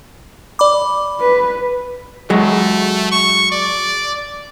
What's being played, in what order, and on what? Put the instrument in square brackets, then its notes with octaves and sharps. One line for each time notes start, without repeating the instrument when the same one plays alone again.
[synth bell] D5 B5 D6
[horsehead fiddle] B4
[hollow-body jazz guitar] F#3 G#3 [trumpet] A3
[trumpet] C#6
D5